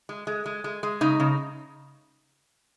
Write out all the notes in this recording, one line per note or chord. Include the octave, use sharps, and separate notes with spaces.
G#3
G#3
G#3
G#3
G#3
C#3 D#4
C#3